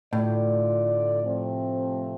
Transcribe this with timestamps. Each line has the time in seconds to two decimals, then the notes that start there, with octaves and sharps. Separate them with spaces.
0.13 A2 D3 A3 F4 D5
1.21 C3 F3 A3 C4